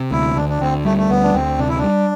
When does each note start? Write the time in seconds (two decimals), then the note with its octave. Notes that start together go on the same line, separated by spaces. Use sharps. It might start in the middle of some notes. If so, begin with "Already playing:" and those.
Already playing: C3
0.11 D2 E4
0.36 D2 D4
0.49 D4
0.61 D2 C4
0.85 G3 A3
0.98 A3
1.10 D2 B3
1.24 D4
1.34 D2 C4
1.58 C3 D4
1.69 E4
1.78 D4
1.83 G3